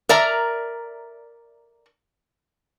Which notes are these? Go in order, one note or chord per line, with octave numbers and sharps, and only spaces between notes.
A#4 D5 E5 A#5